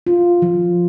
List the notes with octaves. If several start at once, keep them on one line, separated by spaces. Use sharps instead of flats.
F4
F3